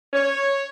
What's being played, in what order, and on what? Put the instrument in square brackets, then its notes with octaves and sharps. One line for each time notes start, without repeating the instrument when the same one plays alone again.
[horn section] C#5